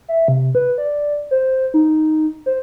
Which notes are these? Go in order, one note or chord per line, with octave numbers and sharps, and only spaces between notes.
E5
C3
B4
D5
C5
D#4
C5